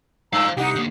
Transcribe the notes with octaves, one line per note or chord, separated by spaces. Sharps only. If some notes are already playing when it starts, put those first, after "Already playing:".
G2 C5 F5 A#5 E6
C2 D#4 G4 F#5 D#6
D3 A#3